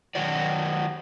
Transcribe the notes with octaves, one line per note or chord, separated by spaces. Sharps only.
D#3 F#3 F#4 D5